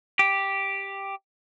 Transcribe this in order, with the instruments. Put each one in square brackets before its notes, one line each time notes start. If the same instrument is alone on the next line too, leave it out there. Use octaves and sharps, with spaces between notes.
[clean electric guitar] G4